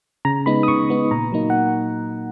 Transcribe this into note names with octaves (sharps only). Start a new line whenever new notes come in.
C#3 A#5
G#3 B3 D#4 B5
D#6
C#3 C#6
G#3 B3 D#4
A#2 A#5
F#3 A#3 D#4
F#5